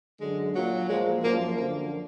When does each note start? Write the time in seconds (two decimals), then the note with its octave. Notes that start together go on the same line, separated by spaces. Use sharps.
0.21 F#2 D3 F#3 G#3
0.55 A#2 F#3
0.89 A#2 F3 G#3
1.23 F#2 F3 A#3
1.57 F#2 D3 F3 A#3